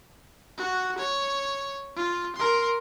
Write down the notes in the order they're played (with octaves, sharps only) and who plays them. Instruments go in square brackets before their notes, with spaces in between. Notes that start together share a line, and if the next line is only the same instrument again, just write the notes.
[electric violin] F#4
C#5
F4
A#4 C6